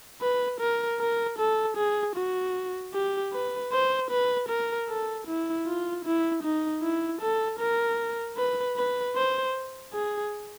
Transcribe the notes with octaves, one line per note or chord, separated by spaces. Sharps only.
B4
A#4
A#4
A4
G#4
F#4
G4
B4
C5
B4
A#4
A4
E4
F4
E4
D#4
E4
A4
A#4
B4
B4
C5
G#4